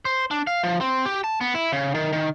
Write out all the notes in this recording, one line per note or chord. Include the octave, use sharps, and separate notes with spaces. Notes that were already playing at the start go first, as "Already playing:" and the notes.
C5
D4
F5
F3
C4
G4
A5
B3
E4
C#3
D#3
D#3